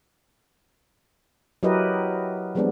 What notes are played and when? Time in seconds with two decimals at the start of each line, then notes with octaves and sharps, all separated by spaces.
1.63 F#3 E4 G4 A#4 B4 D#5
2.55 F3 G3 G#3 B3 C4 D4